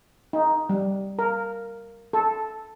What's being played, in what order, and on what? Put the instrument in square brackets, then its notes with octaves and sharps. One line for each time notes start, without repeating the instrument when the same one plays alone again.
[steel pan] D#4
G3
A#4
A4